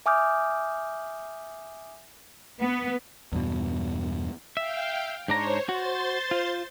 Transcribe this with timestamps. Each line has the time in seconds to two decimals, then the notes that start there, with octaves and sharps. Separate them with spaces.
0.06 E5 G#5 D6 D#6 F6 G6
2.61 B3
3.32 E2 G2 B2
4.57 E5 F5 G5
5.28 G#2 D4 C5 C#5 A#5
5.69 F#4 C5 C6 A6
6.31 F4